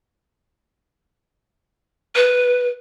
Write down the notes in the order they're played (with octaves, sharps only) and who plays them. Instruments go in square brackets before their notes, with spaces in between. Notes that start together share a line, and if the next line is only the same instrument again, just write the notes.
[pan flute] B4